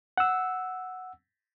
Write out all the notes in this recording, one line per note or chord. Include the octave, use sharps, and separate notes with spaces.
F#5 E6